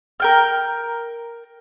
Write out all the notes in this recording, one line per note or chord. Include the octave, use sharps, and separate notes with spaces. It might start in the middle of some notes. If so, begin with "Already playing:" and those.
A#4 G5 F6